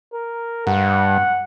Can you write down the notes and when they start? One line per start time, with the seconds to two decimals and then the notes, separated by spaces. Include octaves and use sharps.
0.13 A#4
0.67 G2 F#5